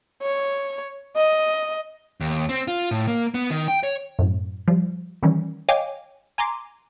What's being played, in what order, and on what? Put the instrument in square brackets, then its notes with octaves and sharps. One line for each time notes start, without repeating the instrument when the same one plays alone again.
[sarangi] C#5
D#5
[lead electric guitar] D#2
C4
F4
A2
A#3
B3
D#3
G5
C#5
[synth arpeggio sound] F#2 A2
F3 G3
D#3 E3 G3 C#4
C#5 D#5 F5 G5 G#5 D6
G#5 A#5 C6 D6